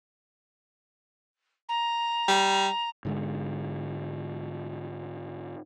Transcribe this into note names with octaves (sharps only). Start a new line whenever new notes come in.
A#5
G3
G#2 D3 G#3